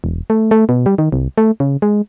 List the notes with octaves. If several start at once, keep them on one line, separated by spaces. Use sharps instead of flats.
E1
A3
A3
B2
G3
D#3
C2
A3
C#3
G#3